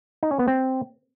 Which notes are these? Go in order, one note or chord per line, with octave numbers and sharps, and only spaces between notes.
D#4
C#4
B3
C4